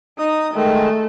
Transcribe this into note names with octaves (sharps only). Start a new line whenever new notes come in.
D#4 D#6
D#3 G#3 A3